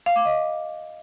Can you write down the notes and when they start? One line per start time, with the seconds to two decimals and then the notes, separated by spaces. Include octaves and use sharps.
0.06 F5
0.16 D6
0.25 D#5